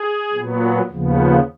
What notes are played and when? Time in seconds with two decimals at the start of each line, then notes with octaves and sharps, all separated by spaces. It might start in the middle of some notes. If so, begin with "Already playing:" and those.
Already playing: G#4
0.32 A#2 F#3 B3
0.90 D#2 C#3 F3 B3